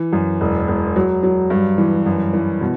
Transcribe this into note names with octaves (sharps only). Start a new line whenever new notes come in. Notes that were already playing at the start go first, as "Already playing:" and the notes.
Already playing: E3
F#2
E1
E1
F#3
F#3
G2
E3
F#2
E3
B2